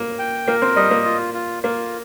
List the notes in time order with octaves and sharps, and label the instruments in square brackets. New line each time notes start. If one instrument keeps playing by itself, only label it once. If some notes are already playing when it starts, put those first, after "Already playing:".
Already playing: [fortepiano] A#3
[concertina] G5
[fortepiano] A#3 [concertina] A#4
[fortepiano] C4
[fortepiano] G3 [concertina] D#5
[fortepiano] A#3
[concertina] F4
F4
[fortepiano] A#3 [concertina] F4